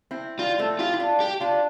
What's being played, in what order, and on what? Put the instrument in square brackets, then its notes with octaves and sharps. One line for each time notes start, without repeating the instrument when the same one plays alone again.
[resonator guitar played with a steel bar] C4 E4
[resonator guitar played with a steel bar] G3 [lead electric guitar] F4
[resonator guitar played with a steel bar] A3 C4
[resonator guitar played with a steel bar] E4 G4 [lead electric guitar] F4
[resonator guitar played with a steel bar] E4
D4 F4
[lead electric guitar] G4
[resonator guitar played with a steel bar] D4 F4